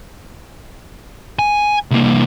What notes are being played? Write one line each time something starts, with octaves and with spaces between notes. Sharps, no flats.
G#5
C2 A#3